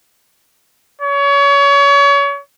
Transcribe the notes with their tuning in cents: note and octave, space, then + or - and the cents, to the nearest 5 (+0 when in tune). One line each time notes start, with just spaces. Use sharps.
C#5 +30